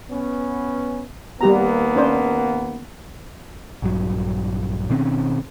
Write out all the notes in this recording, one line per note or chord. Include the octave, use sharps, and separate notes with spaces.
B3 C#4
D#2 G3 A#3 B3 G4 A#5
C#4 D4 C5
A#1 G2 F#3
B2 D#3 C4 C#4